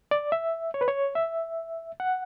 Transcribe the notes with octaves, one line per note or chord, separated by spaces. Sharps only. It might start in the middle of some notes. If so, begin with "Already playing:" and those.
D5
E5
C#5
B4
C#5
E5
F#5